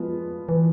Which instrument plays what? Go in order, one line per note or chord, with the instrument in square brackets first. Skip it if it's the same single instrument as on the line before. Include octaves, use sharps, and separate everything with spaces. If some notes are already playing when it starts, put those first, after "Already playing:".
Already playing: [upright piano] F3 G#3 B3 F4
[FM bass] E3